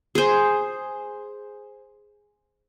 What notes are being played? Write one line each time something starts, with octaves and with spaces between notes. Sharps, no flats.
G#4 C5